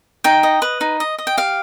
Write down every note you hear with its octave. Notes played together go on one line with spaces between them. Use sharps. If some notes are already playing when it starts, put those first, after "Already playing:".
D#4 G5
D#5
B4
D#4
D#5
D#5
G5
G4 F5